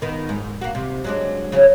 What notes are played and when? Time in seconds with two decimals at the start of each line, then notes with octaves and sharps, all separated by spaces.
0.02 D#3 B3
0.29 G#2
0.61 A#3 F#4
0.75 C3
1.04 F#3 G#3 D4
1.52 C#3 F#3 C#4